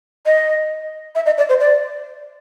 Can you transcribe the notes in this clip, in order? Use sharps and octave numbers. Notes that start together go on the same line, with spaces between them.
D#5
E5
D#5
D5
C5
D5